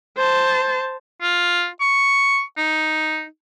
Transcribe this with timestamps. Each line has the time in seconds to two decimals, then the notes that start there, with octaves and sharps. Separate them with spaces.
0.17 C5 A5
1.22 F4
1.81 C#6
2.57 D#4